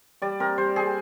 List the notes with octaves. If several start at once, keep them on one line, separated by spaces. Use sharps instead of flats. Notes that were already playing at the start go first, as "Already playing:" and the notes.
G3 D5
C4 A#4
G3 C5
C4 G#4